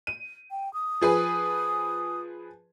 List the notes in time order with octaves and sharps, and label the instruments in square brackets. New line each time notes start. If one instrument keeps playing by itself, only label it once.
[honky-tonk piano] D#7
[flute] G5
D#6
[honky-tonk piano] F3 G#4 B4